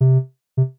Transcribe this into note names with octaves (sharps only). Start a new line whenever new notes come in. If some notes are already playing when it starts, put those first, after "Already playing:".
C3
C3